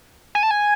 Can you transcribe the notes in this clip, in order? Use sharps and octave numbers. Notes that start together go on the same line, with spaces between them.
G#5
A5
G#5